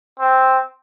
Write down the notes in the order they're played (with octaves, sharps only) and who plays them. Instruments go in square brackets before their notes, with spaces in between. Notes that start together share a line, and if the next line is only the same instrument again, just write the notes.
[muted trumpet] C4